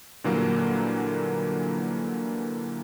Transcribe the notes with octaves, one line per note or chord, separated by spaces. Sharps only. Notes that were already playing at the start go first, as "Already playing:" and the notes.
A#2 D3 E3 F#3 G3 A#3